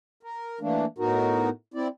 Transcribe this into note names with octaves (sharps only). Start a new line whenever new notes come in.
A#4
E3 A3 A#3 D4
A2 B3 D#4 F#4 A#4
C4 E4 D5